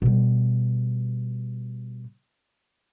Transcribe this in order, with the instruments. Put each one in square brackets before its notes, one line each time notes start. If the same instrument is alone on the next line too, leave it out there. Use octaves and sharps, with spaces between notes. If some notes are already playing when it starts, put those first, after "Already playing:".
[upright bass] B2 G3